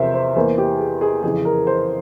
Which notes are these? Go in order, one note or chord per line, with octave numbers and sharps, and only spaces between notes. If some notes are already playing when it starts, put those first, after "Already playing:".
Already playing: E2 C3 F3 A#4 C5 E5
C5
E2 E3 A#3 C5
G4
G#4
G#4
F2 C#3 E3 G#4
A#4
C5